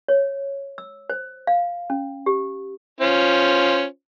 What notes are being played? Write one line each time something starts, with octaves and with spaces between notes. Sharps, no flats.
C#5
E6
C5
F5
C#4
G4
C#4 F4 C5